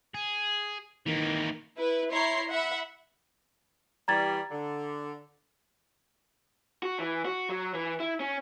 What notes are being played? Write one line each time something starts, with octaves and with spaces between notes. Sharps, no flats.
G#4
D#3 E3 A#3
E4 B4
E4 C#5 A#5 C6 C7
E5 F#5 B5
E3 G3 A#5 G#6 A6
D3
F#4
E3
F#4
F#3
E3
E4
C#4